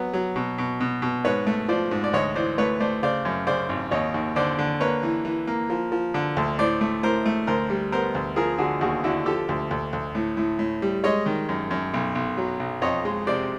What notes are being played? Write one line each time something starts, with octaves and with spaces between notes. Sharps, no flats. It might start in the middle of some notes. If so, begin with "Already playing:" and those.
Already playing: F#3 B3
F#3
B2
B2
B2
B2
G#2 B4 C#5
A3
F3 C5 D5
G#2
D5
D2 C#5 D#5
E3 C5 D5
A3 B4 C#5
A3 C5 D5
C#3 C5 D5
F#2
C#3 C5 D5
G#1
D#2 C#5 D#5
D#2
D3 C5 D5
D3
A#3 B4 C#5
E3
E3
A#3
F3
F3
D3
D2
A2 C5 D5
A3
A2 A#4 C5
A3
D2 A#4 C5
G3
B3 A#4 C5
D2
F3 G#4 A#4
D3 F#4 G#4
D#2 F#4 G#4
D3 E4 F#4
F3 G4 A4
D2
D2
D2
A2
A2
A2
G3
G#3 C#5 D#5
D#3
F#2
F#2
B1
B1
F#3
B1
F2 C#5 D#5
G#3
C3 C5 D5